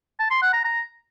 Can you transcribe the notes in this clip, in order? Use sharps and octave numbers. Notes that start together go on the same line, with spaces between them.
A5
C6
F#5
A#5
A#5